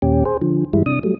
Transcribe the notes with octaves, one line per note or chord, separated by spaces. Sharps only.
D#2 A#2 C#4 G4
G#4 C5
D3 F3
G2 E3 G3 G#3 E4
C3 D4 D#6
F#3 G3 A3